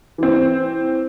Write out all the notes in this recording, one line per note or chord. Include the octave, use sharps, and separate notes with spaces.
E3 C4